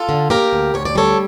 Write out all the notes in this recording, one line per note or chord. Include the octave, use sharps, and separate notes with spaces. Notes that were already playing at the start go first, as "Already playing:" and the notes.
Already playing: F4 A4
D3
A#3 G4 A#4
D2
D2 C#5
D5
G3 A4 C#5